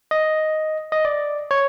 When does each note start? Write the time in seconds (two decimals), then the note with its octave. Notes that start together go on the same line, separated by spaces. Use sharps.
0.11 D#5
0.92 D#5
1.05 D5
1.51 C#5